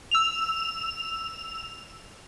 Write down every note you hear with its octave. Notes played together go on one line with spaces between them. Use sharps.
E6 F7